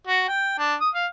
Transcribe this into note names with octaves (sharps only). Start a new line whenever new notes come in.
F#4
G5
D4
D#6
F5